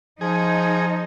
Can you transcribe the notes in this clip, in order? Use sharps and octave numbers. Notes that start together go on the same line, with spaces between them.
F3 D#4 G#4